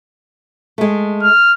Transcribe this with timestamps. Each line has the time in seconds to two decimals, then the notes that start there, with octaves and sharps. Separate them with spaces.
0.78 G#3 A3
1.23 F6